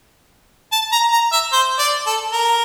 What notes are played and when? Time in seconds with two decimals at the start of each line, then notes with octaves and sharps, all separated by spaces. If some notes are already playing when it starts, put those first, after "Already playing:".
0.72 A5
0.92 A#5
1.12 A#5
1.32 E5
1.53 C5
1.79 D5
2.07 A4
2.33 A#4